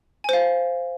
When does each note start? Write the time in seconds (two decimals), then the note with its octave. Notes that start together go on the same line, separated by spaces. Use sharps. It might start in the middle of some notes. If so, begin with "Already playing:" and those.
0.24 G#5
0.29 C5
0.33 F5